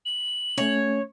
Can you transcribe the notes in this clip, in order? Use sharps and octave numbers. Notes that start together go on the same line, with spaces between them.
F#7
A3 C#4 C#5